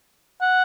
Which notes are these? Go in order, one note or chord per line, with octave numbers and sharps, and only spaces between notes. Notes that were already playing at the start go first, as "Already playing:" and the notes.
F#5